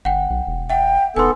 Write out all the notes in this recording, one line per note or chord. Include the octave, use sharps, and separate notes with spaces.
G1 F#5 G5
B1
E1
E5 F#5 G5
E1 B3 D#4 A4 G#5 C6